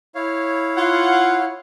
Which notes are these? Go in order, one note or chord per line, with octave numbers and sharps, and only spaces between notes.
E4 C#5 F5
F4 F#5